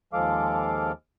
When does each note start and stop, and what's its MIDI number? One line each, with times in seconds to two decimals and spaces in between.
0.13 0.92 39
0.13 0.92 53
0.13 0.92 56
0.13 0.92 69
0.13 0.92 77
0.13 0.92 86